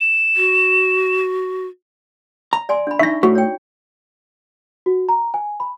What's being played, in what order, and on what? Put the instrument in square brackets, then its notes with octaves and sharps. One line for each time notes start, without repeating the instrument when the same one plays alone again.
[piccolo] E7
[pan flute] F#4
[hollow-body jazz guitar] A#5
[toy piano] D5 G#5 C6
D4 B5
[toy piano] D4 D#4 C#6 [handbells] E5 A#6
[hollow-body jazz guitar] A2 [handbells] F#4
[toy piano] C#5 G5
[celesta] F#4
A#5
G#5
B5